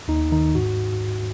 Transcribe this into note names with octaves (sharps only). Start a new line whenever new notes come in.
D#2 D#4
D#3 D#4
G#2 F#4